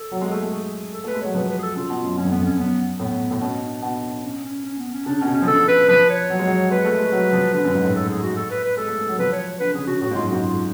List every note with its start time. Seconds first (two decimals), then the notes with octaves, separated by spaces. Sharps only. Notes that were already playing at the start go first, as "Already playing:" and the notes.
Already playing: A4
0.11 F#3
0.21 G#3
0.32 A3
0.42 G#3
0.52 G#4
0.94 A4
1.04 A3 B4
1.14 G#3
1.21 F#3 C#5
1.35 F3 B4
1.48 B4
1.58 G#4
1.63 A4
1.76 C#3 F4
1.90 B2
2.04 F#2
2.17 F#2 C#4
2.25 F2
2.31 B3
2.39 F2
2.45 C#4
2.58 F#2 B3
3.00 A2 B3
3.31 A2
3.41 B2 C#4
3.62 D4
3.82 B2
4.24 C#4
4.44 C#4
4.65 C#4
4.78 B3
4.92 C#4
5.06 C#3 D4
5.20 B2 C#4
5.27 C#3
5.34 C#4
5.42 F3
5.47 D3 A4
5.68 B4
5.88 F3 B4
6.09 C#5
6.30 F#3
6.39 G#3
6.47 F#3
6.71 G#3 B4
6.85 A3
6.98 G#3
7.12 F#3
7.33 F3
7.54 D3 B4
7.64 F#2
7.75 G#2
7.85 A2
7.95 A4
8.09 G#4
8.22 F#4
8.36 A4
8.50 B4
8.63 B4
8.77 G#3 A4
8.88 A3
8.98 G#3
9.08 F#3
9.19 F3 B4
9.32 C#5
9.60 D3 B4
9.74 C#3 G#4
9.87 C#3 F#4
10.01 A2 F#4
10.11 G#2
10.15 F4
10.22 F#2
10.29 G#2 F#4
10.42 F#2 F4